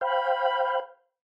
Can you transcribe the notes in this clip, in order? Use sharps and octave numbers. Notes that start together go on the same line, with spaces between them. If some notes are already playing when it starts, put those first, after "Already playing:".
C5 F5 G5 B5